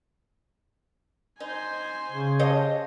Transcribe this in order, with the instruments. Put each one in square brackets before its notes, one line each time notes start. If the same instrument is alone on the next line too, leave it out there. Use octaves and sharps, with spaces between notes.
[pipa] D#4 [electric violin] C5 G#5
[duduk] C#3
[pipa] G4 C5 D#5 [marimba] C#5 F5 A5